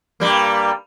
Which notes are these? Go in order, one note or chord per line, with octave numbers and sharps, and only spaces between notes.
G2 G3 A#3